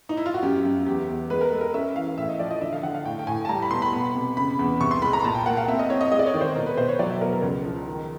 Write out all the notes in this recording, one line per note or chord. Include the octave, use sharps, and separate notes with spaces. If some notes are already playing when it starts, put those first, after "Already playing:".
D#4
E4
F4
F#4
F#2 G4
F#2
E2 G4
E2
G#3 B4
A#4
G#3 A4
A#4
C#4 E5
E3 F5
A2 E5
D#5
F3 D5
D#5
D3 E5
F5
D3 F#5
F5
A2 G5
G5
A2 G#5
A5
G3 A#5
B5
B2 C6
B5
B3
C3
C#3 B5
E2
C2 C#6
C6
G#3 B5
A#5
A#2 A5
G5
A#3 F#5
F5
C4 E5
D#5
C4 C#5
D#5
G#3 D#5
D5
C#5
D#3
C5
B2 A#4
B4
B2 C5
C#5
F#3 D5
E5
B3 A#4
A#4
C#2
F3
D#3